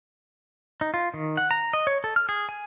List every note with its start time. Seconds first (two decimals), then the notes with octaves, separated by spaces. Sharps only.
0.81 D#4
0.94 F4
1.14 D#3
1.37 F#5
1.51 A#5
1.73 D#5
1.87 C#5
2.04 A4
2.16 F6
2.29 G#4
2.49 G#5